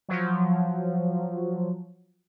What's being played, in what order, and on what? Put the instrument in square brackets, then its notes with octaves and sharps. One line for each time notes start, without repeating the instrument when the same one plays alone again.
[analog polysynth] F3 F#3